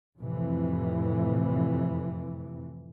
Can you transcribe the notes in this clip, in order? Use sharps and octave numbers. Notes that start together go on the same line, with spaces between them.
F2 A2 C3 E3